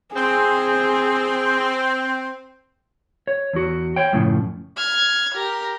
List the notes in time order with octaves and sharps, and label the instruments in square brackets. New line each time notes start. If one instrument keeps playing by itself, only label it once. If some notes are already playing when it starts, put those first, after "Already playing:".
[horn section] C4 [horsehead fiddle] G#4
[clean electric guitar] C#5
E2 F#4
C#5 G5
F#2 A2 C#3 F3
[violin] F6 G#6
G4 A#4